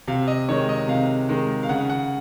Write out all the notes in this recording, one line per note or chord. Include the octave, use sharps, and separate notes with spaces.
C3 F5
D#5
D#3 G#3 C#5
D#5
C3 F5
D#3 G#3
F5
C#3 F#5
F#5